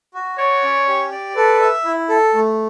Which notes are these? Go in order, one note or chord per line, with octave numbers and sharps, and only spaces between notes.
F#4
C#5 D5
C#4
G4
D5
A4 B4
E5
E4
A4
A3